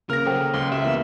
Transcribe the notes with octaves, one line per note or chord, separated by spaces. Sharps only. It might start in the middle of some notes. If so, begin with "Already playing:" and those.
C#3 A#3 A#4 F6 A#6
F#3 A4 C5 G5
C#2 C6
G4 E5
E3 A#3 B3